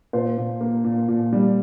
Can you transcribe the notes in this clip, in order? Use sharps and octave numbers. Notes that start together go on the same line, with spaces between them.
A#2 C5
A#2
A#3
A#2
A#2
G3